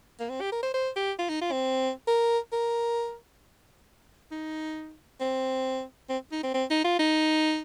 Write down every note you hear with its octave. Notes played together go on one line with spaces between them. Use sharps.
A#3
C4
G4
A#4
C5
C5
G4
F4
D#4
F4
C4
A#4
A#4
D#4
C4
C4
D#4
C4
C4
D#4
F4
D#4